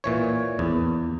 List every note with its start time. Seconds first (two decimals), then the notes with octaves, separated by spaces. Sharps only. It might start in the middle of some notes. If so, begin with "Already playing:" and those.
0.04 A#2 E3 C#5
0.59 E2